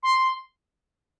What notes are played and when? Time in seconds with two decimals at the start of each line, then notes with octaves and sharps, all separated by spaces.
0.03 C6